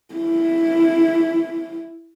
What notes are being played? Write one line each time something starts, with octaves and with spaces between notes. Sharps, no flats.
E4